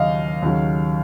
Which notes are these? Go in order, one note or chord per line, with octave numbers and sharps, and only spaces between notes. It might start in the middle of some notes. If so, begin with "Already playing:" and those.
Already playing: D#2 C#3 F#3 D#5 F5
D#2 C#3 F#3